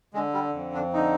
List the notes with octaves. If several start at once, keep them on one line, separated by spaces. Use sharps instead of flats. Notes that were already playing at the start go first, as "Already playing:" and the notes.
D3 G#3
G3
F2
D4
D3 D#4